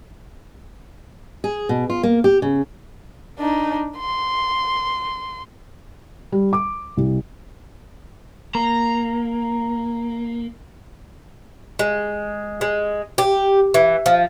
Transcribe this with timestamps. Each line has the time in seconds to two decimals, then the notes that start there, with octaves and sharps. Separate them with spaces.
1.44 G#4
1.69 B2
1.90 F4
2.03 A#3
2.24 G4
2.42 C#3
3.39 D4 D#4
3.98 C6
6.32 G3
6.53 D6
6.97 C2
8.55 A#3 A#5
11.79 G#3
12.61 G#3
13.18 G4
13.74 E3
14.06 F3